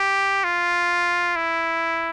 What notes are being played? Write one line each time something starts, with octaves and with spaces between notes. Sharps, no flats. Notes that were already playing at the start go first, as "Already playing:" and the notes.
Already playing: G4
F4
E4